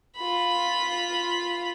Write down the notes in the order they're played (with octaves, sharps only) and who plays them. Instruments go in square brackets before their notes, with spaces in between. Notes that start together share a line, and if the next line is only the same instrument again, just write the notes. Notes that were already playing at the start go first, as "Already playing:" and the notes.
[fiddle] F4 B5